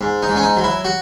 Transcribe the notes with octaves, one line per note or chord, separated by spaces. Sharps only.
G#2
D#4
G#2
C#4
D#4
F#3
E4
F#4